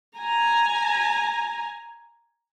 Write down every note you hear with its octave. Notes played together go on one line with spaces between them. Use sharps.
G#5 A#5